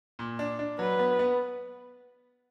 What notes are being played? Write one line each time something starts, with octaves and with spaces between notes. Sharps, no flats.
A#2
D4
D4
F#3 B4
B3
B3